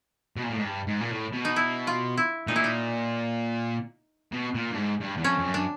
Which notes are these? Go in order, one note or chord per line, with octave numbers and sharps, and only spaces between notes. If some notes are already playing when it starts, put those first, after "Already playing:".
B2
A#2
A2
G#2
G2
G#2
A#2
A2
B2
D#4
E4
F4
E4
A#2 D#4
E4
D#4
B2
A#2
G2
G#2
G2
E2
F2 C#4
F2
F#2
D4